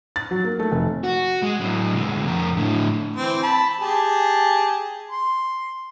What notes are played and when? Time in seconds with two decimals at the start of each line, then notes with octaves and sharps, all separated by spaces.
0.16 A6
0.31 F#3
0.44 A#3
0.59 A3
0.72 F1
1.03 F#4
1.42 G#3
1.60 A2 F#3
1.95 D2 G#3
2.28 F2 A#4
2.57 A2 D3
3.16 E3 C4
3.43 A5 B5
3.80 G4 G#4 A5
5.11 C6